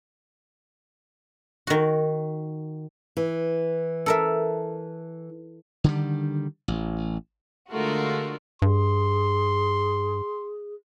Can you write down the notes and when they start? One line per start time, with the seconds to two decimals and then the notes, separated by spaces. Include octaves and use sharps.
1.67 D#3 F#4
3.17 E3
4.06 A4 A#4 E5
5.84 D3 D#3 G3
6.68 A1
7.71 D3 G#3 A3 F4 F#4 A#4
8.62 G2 G#4 C6